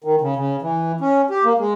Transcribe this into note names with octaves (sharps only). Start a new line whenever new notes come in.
D#3
C#3
C#3
E3
C#4
G4
A#3
G#3